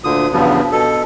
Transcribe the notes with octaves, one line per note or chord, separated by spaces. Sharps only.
D2 A#2 D3 D#6
E2 G2 C#3 F3 F#3 B3
B2 A4